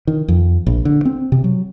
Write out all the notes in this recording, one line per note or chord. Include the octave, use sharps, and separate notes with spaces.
D#3
F2
A#1
D3
C4
C3
F#3